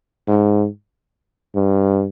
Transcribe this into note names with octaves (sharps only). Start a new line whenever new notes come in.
G#2
G2